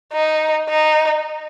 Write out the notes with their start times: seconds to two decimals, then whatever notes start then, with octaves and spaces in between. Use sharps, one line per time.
0.13 D#4
0.69 D#4